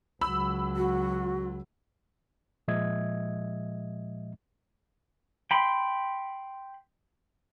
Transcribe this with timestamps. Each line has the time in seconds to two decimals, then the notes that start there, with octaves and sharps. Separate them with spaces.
0.21 C#2 F#3 B5 E6
0.76 F#4
2.68 A#2 F3 G#3 D#5 E5 G#6
5.51 G5 B5 C6